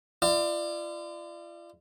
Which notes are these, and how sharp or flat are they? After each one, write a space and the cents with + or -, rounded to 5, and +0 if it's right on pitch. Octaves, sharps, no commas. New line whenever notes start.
F4 -40 D5 +30